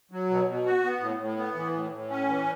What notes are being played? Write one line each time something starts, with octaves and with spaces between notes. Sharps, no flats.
F#3
B2
B2
F#4
B3
A2
A2
B3
E3
A2
A2
C#4
E3